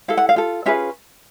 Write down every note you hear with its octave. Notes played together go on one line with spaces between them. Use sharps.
E4 A4 F5
F#5
F5
F4 A4
C#4 F4 G#4 B4 E5